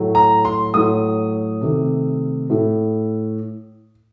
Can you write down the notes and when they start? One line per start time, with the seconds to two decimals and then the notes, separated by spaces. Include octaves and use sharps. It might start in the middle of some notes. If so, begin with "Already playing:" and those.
Already playing: A2 F#3 A3
0.15 A#5
0.45 C6
0.74 A2 F#3 A3 D#6
1.62 C3 D#3 A3
2.50 A2 A3